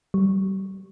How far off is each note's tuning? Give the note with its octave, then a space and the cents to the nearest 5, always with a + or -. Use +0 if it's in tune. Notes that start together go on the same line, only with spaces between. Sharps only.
G3 -35